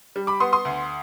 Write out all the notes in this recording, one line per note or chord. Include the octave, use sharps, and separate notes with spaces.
G3
B5 D6
B3 C6 D#6
C6 D#6
D2